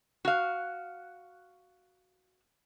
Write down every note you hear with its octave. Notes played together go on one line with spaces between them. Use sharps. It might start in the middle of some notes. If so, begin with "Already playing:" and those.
F#4 F5